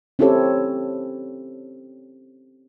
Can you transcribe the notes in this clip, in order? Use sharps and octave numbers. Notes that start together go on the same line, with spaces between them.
C4 C#4 E4 G4 A4 C#5